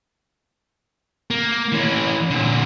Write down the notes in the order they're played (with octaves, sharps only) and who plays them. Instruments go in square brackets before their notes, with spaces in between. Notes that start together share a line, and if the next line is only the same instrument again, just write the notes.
[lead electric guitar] A#3
E3 C#4
A#2 D3